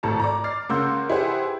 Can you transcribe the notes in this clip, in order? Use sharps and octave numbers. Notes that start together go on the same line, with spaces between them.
G#1 A2 A4 A5 A#5
D5 A#5
D6 F6 A6 C7
C#3 A#3 F#5 C6 E6 G6
E4 G4 G#4 B4 C5 F#5